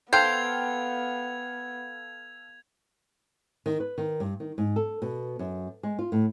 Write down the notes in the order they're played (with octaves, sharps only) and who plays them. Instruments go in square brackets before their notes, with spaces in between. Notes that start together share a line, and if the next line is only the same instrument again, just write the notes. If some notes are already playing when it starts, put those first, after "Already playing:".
[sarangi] B3 [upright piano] A4 F5 G5 [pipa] C5 [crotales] G#6 F7
[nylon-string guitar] D#3
B4
D#3
G2
D#3
G#2
A4
B2
F#2
G#3
F4
A2